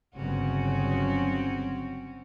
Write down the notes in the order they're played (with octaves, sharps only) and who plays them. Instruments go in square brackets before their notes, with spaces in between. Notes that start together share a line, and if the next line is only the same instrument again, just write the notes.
[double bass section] G1 C#3 F#3 [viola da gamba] C4 C#4 F#4